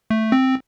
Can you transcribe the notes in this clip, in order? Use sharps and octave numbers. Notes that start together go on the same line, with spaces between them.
A3
C4